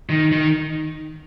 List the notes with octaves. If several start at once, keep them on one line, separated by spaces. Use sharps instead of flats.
D#3
D#3